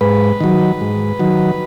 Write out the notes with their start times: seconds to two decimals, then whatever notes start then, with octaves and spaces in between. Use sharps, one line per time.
0.01 G#2 B4
0.40 D#3 F#3
0.81 G#2
1.19 D#3 F#3